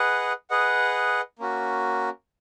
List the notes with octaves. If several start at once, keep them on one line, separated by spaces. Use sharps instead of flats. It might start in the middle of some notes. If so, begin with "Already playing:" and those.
Already playing: G#4 B4 D#5 F#5
G#4 B4 D#5 F#5
A#3 C#4 F#4